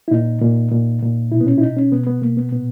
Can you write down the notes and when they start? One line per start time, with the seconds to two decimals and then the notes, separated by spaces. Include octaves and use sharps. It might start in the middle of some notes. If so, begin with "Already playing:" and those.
0.08 E4
0.11 A#2 D#4
0.42 A#2
0.72 A#2
1.02 A#2
1.31 B2 E4
1.41 B3
1.47 C#4
1.58 E4
1.62 B2 D#4
1.77 C#4
1.92 B2 B3
2.07 B3
2.21 B2 A#3
2.37 B3
2.51 A#2 B3